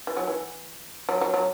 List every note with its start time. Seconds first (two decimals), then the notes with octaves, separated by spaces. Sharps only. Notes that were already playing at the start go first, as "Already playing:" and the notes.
0.07 E3
0.17 F#3
0.27 E3
1.09 F#3
1.21 F#3
1.34 F#3